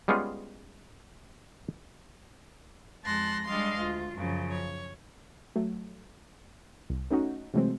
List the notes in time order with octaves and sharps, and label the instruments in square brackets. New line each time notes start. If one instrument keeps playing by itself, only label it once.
[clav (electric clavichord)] G3 G#3 B3 C#4 F4 G#4
[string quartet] F2 G#3 A5 C6 F#6 A#6
G3 G#3 D4 D#5 F5 C6
D2 F4
F#2 C#3 F3
C#5
[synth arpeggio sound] F#3 A3
C2
A3 C#4 D#4 F#4
C3 E3 F#3 G#3 A3 C4